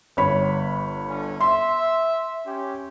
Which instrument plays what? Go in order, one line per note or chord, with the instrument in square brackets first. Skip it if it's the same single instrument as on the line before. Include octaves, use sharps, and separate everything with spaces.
[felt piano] G1 C#5 B5
[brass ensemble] D3 C#4
[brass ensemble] E5 [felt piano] C6
[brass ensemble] C#4 G4